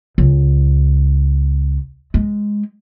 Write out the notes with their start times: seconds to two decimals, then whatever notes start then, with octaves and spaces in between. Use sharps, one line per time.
0.18 C#2
2.14 G#3